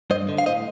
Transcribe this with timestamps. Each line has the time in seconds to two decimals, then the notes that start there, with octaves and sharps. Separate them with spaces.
0.10 G2 C5 D#5
0.29 D3
0.38 F5
0.46 A2 C5 D#5